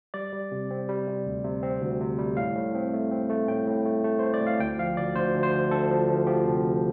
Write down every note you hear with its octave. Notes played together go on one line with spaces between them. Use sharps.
G3 D5
G3
C3
C4
G3
C3
D2
C3
C4
D2
C3
G3
A2 F5
A2
C4
A3
C4
A3
A2 G5
A2
A3
A3
A3 C5
D5
A2
F5
D2 G5
F3 F5
D2 D5
D2 C5
D2
C5
D2
D2 A4
F3
D2
F3 G4
C3
D2